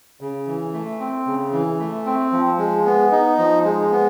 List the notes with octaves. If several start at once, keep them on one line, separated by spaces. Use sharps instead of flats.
C#3
E3
A3
C4
C#3
E3
A3
C4
F3
G#3
B3
D#4
F3
G#3
B3